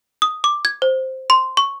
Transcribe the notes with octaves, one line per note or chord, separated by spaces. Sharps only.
D#6
D6
G#6
C5
C6
C#6